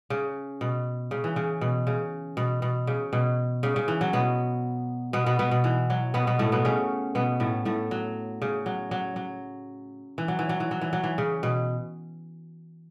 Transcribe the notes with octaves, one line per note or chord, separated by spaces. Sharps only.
C#3
B2
C#3
E3
C#3
B2
C#3
B2
B2
C#3
B2
C#3
C#3
E3
F#3
B2 B3
B2 B3
B2 B3
B2 B3
B2
E3
F#3
B2 B3
B2 B3
A2 A3
B2 B3
C#3 C#4
B2 B3
A2 A3
A2 A3
F#3
C#3
F#3
F#3
F#3
E3
F#3
E3
F#3
E3
F#3
E3
F#3
E3
C#3
B2